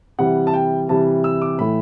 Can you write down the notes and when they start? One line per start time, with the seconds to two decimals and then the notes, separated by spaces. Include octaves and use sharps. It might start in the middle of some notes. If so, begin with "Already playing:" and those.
0.18 C3 E3 G3 F#5
0.47 A5
0.54 G5
0.89 C3 E3 G3 A5
1.24 E6
1.42 D6
1.59 A2 E3 A3 B5